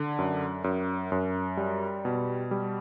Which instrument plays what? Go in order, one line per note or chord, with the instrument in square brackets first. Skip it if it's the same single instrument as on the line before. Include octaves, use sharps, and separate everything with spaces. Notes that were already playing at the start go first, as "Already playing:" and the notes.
Already playing: [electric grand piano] D3
F#2
F#2
F#2
G3
B2
G3